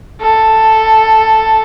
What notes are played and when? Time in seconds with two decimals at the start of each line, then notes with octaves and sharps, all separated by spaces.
0.22 A4